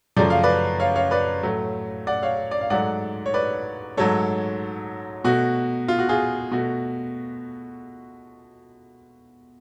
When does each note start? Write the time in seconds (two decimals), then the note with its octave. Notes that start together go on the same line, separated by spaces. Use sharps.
0.17 F#2 C#3 F3 A3 D5
0.30 F5
0.43 B4 D5
0.80 C#5 F5
0.95 C#5 F5
1.11 B4 D5
1.43 A2 F#3 A3
2.07 D5 F#5
2.23 C#5 F5
2.51 D5
2.61 F5
2.70 G#2 F#3 A3 D5 F#5
3.26 C#5
3.34 B4 D5
3.97 G#2 F#3 A3 A4 C#5
5.24 B2 A3 F#4
5.88 F4
5.99 F#4
6.09 F4 G#4
6.52 B2 A3 F#4